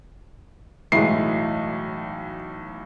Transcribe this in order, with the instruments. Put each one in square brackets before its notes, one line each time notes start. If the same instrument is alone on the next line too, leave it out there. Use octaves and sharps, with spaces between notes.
[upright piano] B1 A2 F#3 [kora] E3 G#3 [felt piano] C7